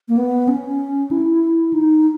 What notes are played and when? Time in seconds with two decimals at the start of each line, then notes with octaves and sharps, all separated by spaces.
0.09 A#3
0.17 B3
0.48 C#4
1.11 E4
1.73 D#4